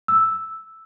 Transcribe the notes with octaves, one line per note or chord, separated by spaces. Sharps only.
E6